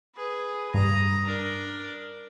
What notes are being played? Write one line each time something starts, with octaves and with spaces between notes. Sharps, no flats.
G#4 B4
G2 A#5 D#6
D4 A#4